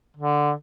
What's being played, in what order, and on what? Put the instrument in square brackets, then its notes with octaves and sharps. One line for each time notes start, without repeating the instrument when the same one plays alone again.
[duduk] D3